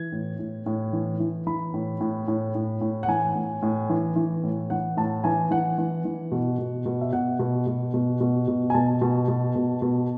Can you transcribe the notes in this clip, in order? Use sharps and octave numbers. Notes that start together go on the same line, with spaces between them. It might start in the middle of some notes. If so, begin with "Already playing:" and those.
Already playing: E3 G#6
A2
A2
A2
E3
E3
E3 B5
A2
A2
A2
A2
A2
F#5
E3 G#5
A2
A2
E3
E3
A2
E3 F#5
A2 A5
E3 G#5
E3 F#5
E3
E3
B2
B2
B2
E5
B2 F#5
B2
B2
B2
B2
B2
G#5
B2 A5
B2
B2
B2
B2